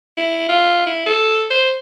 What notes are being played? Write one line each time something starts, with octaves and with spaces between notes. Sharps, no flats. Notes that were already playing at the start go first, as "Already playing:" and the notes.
E4
F4
E4
A4
C5